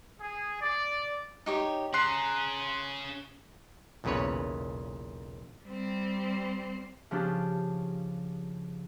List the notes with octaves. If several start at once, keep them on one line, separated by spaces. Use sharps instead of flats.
G#4
D5
D#4 G4 C#5
C#4 G#4 A#5 C6 F#6 C7
B1 E2 A#2 C#3 B4 C#5
G3 C4
C#3 F3 D4 G4